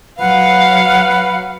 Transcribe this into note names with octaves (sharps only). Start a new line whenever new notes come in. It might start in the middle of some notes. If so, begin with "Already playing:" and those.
F#3 B4 F5 F#5